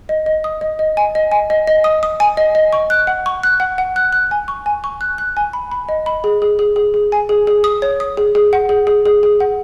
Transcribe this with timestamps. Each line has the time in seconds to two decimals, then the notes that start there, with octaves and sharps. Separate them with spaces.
0.09 D#5
0.26 D#5
0.44 D#6
0.61 D#5
0.79 D#5
0.97 G#5
1.15 D#5
1.32 G#5
1.50 D#5
1.67 D#5
1.84 D#6
2.03 D#6
2.20 G#5
2.37 D#5
2.55 D#5
2.73 C#6
2.90 F#6
3.07 F#5
3.26 C#6
3.43 F#6
3.60 F#5
3.78 F#5
3.96 F#6
4.13 F#6
4.31 G#5
4.48 C#6
4.66 G#5
4.84 C#6
5.01 F#6
5.18 F#6
5.37 G#5
5.53 B5
5.72 B5
5.89 D#5
6.06 B5
6.24 G#4
6.42 G#4
6.59 G#4
6.76 G#4
6.94 G#4
7.12 G#5
7.29 G#4
7.47 G#4
7.64 D#6
7.82 C#5
8.00 D#6
8.17 G#4
8.35 G#4
8.53 F#5
8.69 G#4
8.87 G#4
9.06 G#4
9.23 G#4
9.40 F#5